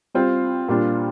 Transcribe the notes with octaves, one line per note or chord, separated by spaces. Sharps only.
G3 C4 F4 C5
A#2 G3 D4 F4